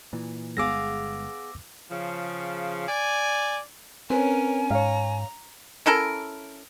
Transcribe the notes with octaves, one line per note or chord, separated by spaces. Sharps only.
A#2 E3
G1 G#3 B3 G#4 F5 D6 E6 A#6
C#3 F3
D5 G#5
C4 C#4 A#4 B4 C#5 G#5
G#2 C#5 F5 A#5
C#4 E4 A4 A#4